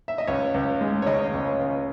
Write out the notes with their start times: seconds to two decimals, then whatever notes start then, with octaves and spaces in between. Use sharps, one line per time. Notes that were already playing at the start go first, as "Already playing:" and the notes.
0.08 E5
0.18 D#5
0.27 C#2 C#5
0.54 C#2
0.81 G#3
1.02 C#5
1.06 C#3 D#5
1.34 C#2
1.60 C#2